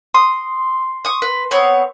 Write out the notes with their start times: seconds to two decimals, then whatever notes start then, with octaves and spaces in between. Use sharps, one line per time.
0.14 C6 D#6
1.05 C#6 D#6
1.22 B4
1.51 B3 C4 C#5